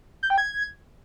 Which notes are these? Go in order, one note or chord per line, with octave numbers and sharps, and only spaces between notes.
G6
G5
G#6